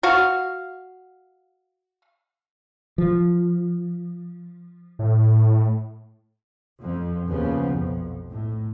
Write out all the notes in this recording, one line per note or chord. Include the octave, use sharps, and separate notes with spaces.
F#4 F5
F3
A2
F2 F3
D#2 C#3 F3 B3
B1 F2
A2